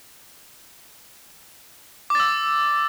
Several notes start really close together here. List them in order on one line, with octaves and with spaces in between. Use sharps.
D6 A6 E6